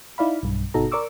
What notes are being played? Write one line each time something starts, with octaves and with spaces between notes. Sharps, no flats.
D#4 E4 D5 F5 B5
B1 G2
G1 B2 D#4 F#4 A4 A#5
A#4 D5 C#6 D6 E6